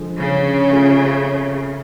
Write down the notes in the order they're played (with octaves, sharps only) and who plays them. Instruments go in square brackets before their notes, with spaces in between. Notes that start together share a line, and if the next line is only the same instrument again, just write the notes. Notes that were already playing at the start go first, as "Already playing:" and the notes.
Already playing: [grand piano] D3 F3 G#3
[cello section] C#3
[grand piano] A3 C#4 F4